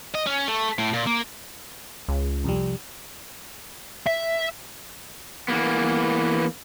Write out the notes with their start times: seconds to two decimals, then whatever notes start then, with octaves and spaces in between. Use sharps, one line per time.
0.15 D#5
0.27 C#4
0.48 A3
0.79 A2
0.93 A#2
1.06 A#3
2.08 C#2
2.44 C2 F2 G3
4.06 E5
5.48 E3 A#3 B3